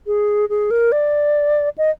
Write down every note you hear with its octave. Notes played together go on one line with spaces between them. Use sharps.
G#4
G#4
A#4
D5
D#5